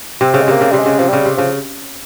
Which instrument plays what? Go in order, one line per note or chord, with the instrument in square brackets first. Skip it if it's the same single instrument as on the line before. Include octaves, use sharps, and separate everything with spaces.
[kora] C3 [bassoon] C4
[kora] C#3
[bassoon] G#3
[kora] C3 [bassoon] A#3
[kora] C#3
[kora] C3 [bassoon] G3
[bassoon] G#3
[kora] C#3
[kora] C3 [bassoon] F3
[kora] C#3 [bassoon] G3
[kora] C3
[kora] C#3 [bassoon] F3